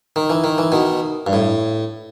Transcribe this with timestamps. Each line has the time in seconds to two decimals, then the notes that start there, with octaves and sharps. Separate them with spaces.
0.16 D#3
0.30 E3
0.44 D#3
0.58 E3
0.72 B2 D#3
1.27 G2
1.33 A2